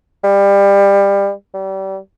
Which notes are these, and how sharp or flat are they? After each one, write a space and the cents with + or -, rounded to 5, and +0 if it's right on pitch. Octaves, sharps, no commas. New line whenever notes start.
G3 +25
G3 -30